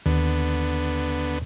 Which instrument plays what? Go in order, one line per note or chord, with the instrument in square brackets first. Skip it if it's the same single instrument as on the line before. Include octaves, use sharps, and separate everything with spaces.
[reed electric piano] D#2 [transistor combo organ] D3 B3